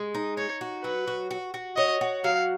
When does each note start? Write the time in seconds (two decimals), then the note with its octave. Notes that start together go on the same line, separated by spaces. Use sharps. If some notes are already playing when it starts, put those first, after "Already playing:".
Already playing: G#3
0.15 D#4
0.37 D#4 C#5
0.61 F#4
0.84 F#3 B4
1.08 F#4
1.31 F#4
1.54 F#4
1.77 C#5 D#5
2.01 F#4
2.24 F#3 F5